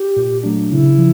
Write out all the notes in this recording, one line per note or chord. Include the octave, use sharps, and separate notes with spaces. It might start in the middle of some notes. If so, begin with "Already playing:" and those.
Already playing: G4
A#2
F#3 A3 D4
C#3 E4
F3